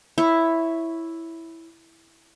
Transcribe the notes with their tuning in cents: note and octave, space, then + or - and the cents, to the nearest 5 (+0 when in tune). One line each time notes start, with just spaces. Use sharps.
E4 +0 C#5 +0